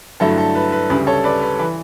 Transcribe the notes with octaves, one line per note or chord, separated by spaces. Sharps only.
G2 D3 F#3 A3 E4 A4
A4
B4
B4
D2 C#3 G3 B4
A4 C#5
B4 D5
B4
E3 B4